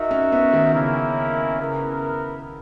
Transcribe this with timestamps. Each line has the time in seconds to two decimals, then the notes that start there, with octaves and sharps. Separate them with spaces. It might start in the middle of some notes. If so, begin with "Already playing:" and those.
Already playing: D#4 F#4 A#4 E5
0.11 C#4
0.32 B3
0.53 D#3
0.74 C#3 A#3 C#4 E4 A#4
1.60 C#3 B3 E4 A#4